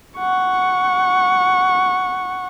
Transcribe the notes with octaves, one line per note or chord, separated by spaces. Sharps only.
F#5 C#6